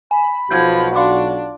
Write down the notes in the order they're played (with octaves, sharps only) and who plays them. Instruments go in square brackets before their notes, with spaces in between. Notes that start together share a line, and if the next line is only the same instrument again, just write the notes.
[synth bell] G#5 [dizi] B5
[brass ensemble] B1 F#4 [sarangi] F3 [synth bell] G6 G#6
[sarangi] D4 [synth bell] F5 C6 D6